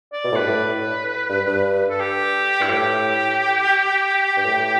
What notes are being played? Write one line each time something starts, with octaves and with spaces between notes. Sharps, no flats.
D5
B2
A2
G2 B4
A2
G2
G2
A4
G4
G2 E4
A2 G4
G2
A2